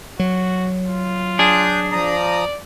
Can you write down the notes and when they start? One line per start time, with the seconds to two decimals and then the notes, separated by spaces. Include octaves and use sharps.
0.20 F#3 F#4
0.86 F4
1.39 D4 G#4 D#6 F#6 G6
1.92 F3 D5 A#5 D#6